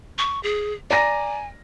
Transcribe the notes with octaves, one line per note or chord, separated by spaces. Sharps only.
C#6
G#4
D5 G#5 A#5 A#6